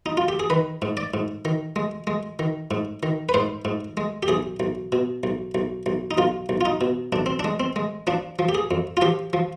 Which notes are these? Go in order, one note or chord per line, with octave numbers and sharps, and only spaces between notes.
D#4
F4
G4
G#4
D#3 B4
G#2
D5
G#2
D#3
G#3
G#3
D#3
G#2
D#3
B4
G#2 C5
G#2
G#3
G4
B1 G#4
B1
B2
B1
B1
B1
D#4
B1 F4
B1
F4
D#4
B2
B1 D4
C4
G#3 D4
C4
G#3
F3 D4
F3
G4
G#4
F2
F4
F3 G4
F3